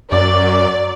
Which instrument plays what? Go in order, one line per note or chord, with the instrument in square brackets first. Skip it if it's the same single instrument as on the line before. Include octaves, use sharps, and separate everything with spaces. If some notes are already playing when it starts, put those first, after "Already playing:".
[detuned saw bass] F#2 [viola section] F#3 D5